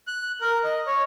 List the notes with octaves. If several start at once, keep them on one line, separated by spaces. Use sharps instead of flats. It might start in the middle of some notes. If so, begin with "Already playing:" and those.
F#6
A#4
D#5
C#5